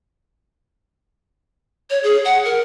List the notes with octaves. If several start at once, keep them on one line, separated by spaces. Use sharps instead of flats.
C#5
G#4
F#5
A#4